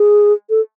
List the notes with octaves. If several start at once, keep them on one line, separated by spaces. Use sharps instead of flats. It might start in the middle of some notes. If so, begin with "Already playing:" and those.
Already playing: G#4
A4